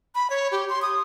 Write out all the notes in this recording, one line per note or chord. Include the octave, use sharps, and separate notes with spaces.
B5
C#5
G4
C6
D#6